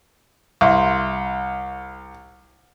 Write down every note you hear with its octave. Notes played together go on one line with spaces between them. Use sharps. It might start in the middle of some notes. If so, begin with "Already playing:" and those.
C2 E5 F5 C6